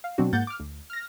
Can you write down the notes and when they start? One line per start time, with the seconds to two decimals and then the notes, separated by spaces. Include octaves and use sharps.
0.04 F5
0.18 B2 F#3 C4 D4 F#4
0.33 G#2 A#3 F#5 G6 A6
0.47 D6 F6
0.60 D2
0.90 F6 A#6